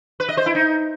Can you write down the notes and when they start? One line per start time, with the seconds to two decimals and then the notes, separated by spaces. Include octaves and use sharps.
0.20 B4
0.29 D#5
0.37 C5
0.46 E4
0.55 D#4